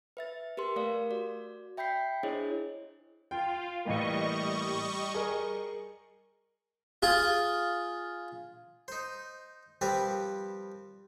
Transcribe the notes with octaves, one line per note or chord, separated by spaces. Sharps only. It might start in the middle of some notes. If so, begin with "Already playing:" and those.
B4 E5 A6
G4 A#4 B4 C6
A3 A#4 D5 F5
F#4 D5
E5 G5 B5 G6 B6 C7
D4 E4 G#4 C5 C#5 D#5
F4 G5
A2 E3 G3 A#3 D#5 C#6
G#4 A#4
F4 G#4
D#4 C5
F3 G3 C4 G4 A#4 B4